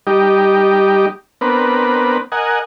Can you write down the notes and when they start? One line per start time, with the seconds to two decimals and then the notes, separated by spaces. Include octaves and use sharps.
0.07 G3 D#4 G4
1.41 B3 C4 D4 A#4 B4
2.32 A#4 D#5 F#5 G#5